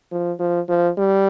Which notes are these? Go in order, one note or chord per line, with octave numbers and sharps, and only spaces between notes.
F3
F3
F3
G3